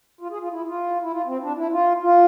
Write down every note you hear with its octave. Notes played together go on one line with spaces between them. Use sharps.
F4
G#4
F4
E4
F4
E4
F4
C4
D4
E4
F4
F4